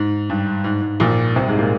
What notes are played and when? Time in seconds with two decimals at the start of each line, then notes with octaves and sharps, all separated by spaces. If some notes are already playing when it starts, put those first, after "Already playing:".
Already playing: G#2
0.30 G2
0.64 G#2
0.82 G#2
1.00 A#1 A#2
1.36 C2 C3
1.47 G#2 G#3
1.59 A#2 A#3